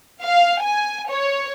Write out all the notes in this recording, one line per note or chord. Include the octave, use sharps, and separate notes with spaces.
F5
G#5
C#5